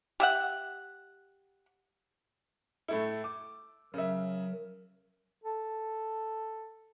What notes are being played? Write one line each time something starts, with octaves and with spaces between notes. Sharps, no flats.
G4 E5 F#5
A2 A3 E4
D6
C#3 F#3 A#4 E5
A4